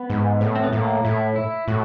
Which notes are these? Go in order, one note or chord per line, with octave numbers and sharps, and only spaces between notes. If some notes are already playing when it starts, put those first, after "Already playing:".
Already playing: B3
G#2
A2
C4
B3
A2 A#3
A2 E4
E4
A2 F#4